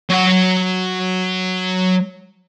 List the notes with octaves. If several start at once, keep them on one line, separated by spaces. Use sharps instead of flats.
F#3 F#5